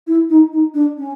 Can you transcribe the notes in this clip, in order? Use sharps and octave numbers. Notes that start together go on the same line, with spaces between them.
E4
D#4
D#4
D4
C#4